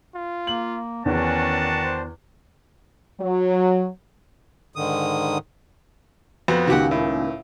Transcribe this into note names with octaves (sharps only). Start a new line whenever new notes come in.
F4
A#3 F#7
E2 D#3 C#4 D4 F#4 A5
C5
F#3
G#2 D3 D#3 D#6
F2 B3 F#4
C#2 A#2 D#3 F#4 G4 F#5
A2